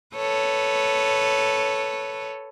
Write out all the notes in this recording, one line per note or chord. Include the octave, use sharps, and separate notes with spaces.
A4 B4 C#5